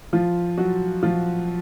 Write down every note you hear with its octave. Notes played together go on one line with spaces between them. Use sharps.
F3 F4
F#3 F#4
F3 F4